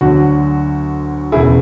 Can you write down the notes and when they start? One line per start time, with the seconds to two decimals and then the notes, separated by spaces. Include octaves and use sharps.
0.01 D2 D3 F#3 F#4
1.32 E1 E2 C#3 E4 G#4